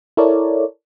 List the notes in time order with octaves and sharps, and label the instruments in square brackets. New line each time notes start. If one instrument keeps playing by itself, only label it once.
[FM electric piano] E4 A4 A#4 C#5 D5